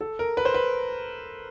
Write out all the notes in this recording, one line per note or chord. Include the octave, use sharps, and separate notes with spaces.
A4
A#4
B4
C5
B4